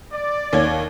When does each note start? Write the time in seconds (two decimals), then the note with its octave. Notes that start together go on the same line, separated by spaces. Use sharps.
0.12 D5
0.53 D#2 C#5 G#6